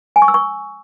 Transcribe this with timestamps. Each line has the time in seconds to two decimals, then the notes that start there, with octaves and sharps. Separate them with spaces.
0.16 G#5
0.22 C#6
0.28 E6
0.34 C#6